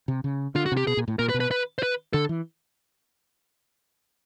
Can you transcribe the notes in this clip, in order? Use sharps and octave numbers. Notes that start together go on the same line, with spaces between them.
C3
C#3
D3 F4
F#4
C3
G4
B2 G#4
A#2
A2
A#2 A#4
B4
B2
B4
B4
C5
B4
D3 A4
E3